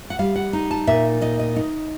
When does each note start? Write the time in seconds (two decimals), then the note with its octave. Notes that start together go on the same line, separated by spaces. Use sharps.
0.10 F#5
0.19 G3 F5
0.36 F#5
0.53 D#4
0.71 A5
0.87 A#2 E5
1.21 D#4 D#5
1.39 D#5
1.56 D#4